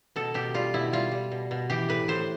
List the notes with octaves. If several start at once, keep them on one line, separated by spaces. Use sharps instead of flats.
B2 A4
B2 G4
G3 F4
B2 E4
G3 F4
G3
B2
B2
E3 G4
A2 B4
A2 C5